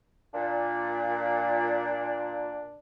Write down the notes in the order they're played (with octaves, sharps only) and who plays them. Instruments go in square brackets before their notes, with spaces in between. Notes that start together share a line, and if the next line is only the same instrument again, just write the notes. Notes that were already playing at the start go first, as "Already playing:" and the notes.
[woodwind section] A#2 [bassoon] D4